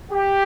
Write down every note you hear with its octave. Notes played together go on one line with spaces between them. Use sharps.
G4